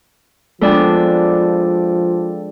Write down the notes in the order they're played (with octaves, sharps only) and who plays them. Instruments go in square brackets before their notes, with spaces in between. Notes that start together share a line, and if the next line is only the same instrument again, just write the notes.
[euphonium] F3 [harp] G#3 B3 D4 [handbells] A4 D5 G5